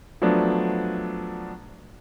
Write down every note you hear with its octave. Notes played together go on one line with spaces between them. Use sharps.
F3 F#3 A3 B3 D4